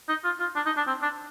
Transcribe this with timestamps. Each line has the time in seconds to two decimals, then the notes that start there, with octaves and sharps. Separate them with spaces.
0.09 D#4
0.24 F4
0.40 F4
0.56 D4
0.66 D#4
0.77 D4
0.87 C4
1.02 D4